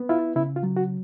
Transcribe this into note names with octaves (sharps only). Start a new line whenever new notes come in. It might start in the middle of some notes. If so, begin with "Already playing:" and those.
Already playing: B3
E4 F4
C#3 E4
F4
F#3
F#4